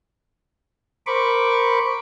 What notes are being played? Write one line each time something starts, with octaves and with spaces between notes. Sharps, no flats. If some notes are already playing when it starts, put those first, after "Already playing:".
A#4 C5 B5 C#6 D6